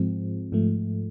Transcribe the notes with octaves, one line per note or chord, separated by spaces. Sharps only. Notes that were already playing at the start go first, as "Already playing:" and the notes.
Already playing: G#2 F3 G#3 C4
G#2 F3 A3